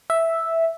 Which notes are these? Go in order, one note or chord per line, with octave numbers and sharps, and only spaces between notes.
E5